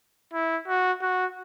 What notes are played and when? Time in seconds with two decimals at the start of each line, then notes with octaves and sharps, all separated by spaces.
0.34 E4
0.68 F#4
1.02 F#4